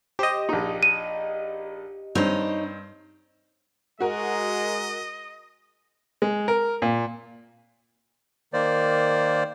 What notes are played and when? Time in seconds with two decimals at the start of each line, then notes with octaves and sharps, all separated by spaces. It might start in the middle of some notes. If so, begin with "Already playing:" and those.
0.19 G4 C5 D#5
0.49 A#1 D#4
0.83 D#7
2.15 G2 C4 D#4 C#5
4.00 G#3 F#4 A#4 D#5
6.22 G#3
6.48 A#4
6.82 A#2
8.53 D#3 A#3 C5 D5